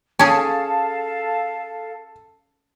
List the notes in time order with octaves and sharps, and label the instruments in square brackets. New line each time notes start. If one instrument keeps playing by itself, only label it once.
[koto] C#4 G#4 [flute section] A4 F5 [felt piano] A5